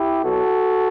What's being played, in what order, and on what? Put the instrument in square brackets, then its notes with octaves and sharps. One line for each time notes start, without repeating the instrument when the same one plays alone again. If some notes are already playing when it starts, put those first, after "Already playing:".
Already playing: [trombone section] E4 G4
B2 F#3 F#4 A4